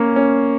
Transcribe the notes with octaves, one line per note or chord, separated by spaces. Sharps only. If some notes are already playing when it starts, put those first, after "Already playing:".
Already playing: A#3 C#4
C#4